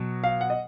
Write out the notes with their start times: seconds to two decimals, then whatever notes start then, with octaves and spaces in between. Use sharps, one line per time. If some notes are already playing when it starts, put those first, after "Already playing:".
Already playing: B2 F#3
0.24 F5
0.41 F#5
0.50 D#5